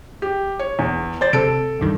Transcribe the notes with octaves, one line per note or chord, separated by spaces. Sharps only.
G4
C#5
E2
C5 D5 A6
C3 A4 D7
C2 G2 D#3